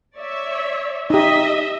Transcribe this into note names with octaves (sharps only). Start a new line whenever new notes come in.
C#5 D5 E5
D#4 G4 D#5 E5